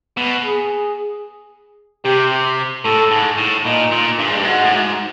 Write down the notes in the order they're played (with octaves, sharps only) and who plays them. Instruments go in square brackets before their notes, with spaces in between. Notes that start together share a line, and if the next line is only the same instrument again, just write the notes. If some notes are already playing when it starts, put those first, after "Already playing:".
[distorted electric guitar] B2
[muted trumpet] G#4
[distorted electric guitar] C3 [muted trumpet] G4
[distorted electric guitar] A2 [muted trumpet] A4
[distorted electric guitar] G#2
A2
[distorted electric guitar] A#2 [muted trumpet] D#4
[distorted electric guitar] A#2
G2
G#2
G2
[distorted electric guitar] G#2 [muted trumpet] F#4
[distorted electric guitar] A2
G#2